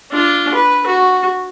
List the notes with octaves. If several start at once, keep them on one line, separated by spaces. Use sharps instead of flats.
D4 F4
B4
F#4